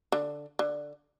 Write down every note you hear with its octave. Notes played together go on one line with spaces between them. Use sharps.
D3
D3